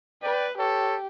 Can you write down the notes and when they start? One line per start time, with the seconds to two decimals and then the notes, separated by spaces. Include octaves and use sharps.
0.23 B4 D5 G5
0.58 G4 A4 C#5